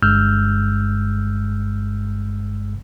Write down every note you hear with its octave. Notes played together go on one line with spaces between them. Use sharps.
G1 G2 G#3 E6 F6 G6